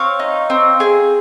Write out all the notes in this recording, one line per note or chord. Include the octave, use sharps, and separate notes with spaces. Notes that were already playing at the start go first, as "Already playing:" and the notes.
Already playing: C4 C#5 F5
D#4
C4
G#4